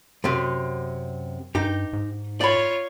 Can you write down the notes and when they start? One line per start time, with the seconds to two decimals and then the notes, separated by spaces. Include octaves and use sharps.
0.24 F#2 C3
1.55 G2 D#4 G4
1.93 G#2
2.41 F4 C#5 D5 B5